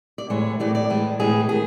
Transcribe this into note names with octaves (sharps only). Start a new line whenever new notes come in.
D5
A2 E3 G#3 C#5
A2 E3 G#3 D5
D5
A2 E3 G#3
A2 E3 G#3 G#4
D#3 G#4